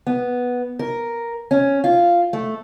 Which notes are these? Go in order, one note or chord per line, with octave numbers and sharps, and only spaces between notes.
B3
A#4
C#4
F4
A3